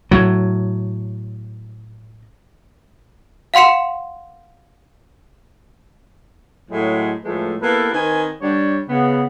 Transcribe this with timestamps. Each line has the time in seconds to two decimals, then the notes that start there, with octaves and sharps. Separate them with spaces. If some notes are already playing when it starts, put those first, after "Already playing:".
0.11 A2 F#3
3.54 F5 F#5 C6 C#7 E7
6.71 A2 F#3 G#3
7.24 A2 E3 F3 G#3 A3
7.61 A#3 B3 E4 G4 A4 B4
7.93 D#3 C4 B4 G#5
8.41 G3 D4 C#5
8.88 C#3 B3